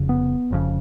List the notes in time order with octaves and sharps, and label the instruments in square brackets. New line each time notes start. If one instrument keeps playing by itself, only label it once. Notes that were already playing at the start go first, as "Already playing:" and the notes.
Already playing: [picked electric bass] F1 F2 C#3
B3
F1 F2 C#3